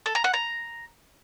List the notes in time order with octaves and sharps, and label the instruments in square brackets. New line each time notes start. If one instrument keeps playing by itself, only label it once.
[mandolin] A4
A#5
F#5
A#5